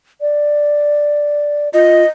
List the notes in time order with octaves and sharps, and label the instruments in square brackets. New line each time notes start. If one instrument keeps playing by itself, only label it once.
[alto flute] D5
[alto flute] F4 [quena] D#5